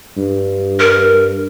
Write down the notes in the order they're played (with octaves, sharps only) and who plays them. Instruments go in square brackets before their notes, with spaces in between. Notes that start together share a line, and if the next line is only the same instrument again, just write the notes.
[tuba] G2
[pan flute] A#4